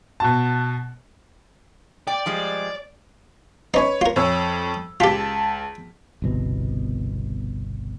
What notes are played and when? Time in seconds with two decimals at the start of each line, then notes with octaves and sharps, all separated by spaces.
0.20 B2 F#4 A5
2.07 D5 G5
2.26 F3 G3 G#3
3.74 C#4 D#4 B4 C#5
4.01 F4 A#4
4.16 F2 C#5 E6
5.00 C#2 F4 G4 A5 B6
6.22 G1 C2 B2